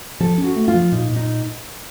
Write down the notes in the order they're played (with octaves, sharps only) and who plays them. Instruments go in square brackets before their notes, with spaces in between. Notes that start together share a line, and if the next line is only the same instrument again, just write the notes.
[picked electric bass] F3 [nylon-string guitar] A4
[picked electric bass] C#4
[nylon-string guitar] F#4
[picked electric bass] A3
[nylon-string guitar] F4
[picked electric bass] F3
[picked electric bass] A#2 [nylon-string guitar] D#4
[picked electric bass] A#2
[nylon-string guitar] D#4